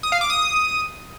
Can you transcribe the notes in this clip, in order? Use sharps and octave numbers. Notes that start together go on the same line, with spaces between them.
D#6
F5
D6
D#6